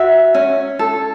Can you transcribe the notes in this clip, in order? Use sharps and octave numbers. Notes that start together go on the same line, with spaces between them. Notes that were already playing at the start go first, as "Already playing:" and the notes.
Already playing: F#4 E5
C#4
A4